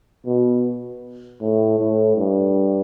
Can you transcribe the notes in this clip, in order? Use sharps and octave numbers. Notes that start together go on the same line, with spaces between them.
B2
A2
A2
G2